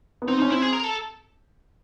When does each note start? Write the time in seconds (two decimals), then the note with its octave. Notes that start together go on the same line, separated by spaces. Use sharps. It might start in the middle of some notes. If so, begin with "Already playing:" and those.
0.22 B3
0.28 C4 D#4
0.40 C#4 D#4
0.50 C4 E4
0.62 G#4
0.73 A#4
0.84 A4